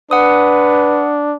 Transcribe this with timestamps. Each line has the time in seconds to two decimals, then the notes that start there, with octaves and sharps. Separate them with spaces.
0.11 D4 B4 F#5 D#6